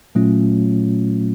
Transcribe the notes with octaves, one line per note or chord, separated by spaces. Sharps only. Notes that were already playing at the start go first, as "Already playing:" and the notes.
A#2 F#3 A3 C#4 F4